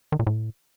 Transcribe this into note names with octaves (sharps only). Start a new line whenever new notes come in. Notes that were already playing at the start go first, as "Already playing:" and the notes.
D#3
A#2
A2